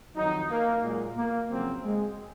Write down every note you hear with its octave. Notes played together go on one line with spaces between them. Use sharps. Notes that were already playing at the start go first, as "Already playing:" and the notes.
F2 D#3 F#3 D#4
A#3
A#2 F#3 G#3
A#3
F2 C#3 F#3 C4
G#3